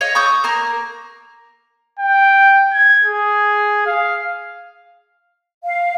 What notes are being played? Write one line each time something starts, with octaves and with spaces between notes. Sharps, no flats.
C#5 D#5 F5
C#6 D#6 E6 G6
A#3 A#4
G5
G#6
G#4
F5
F5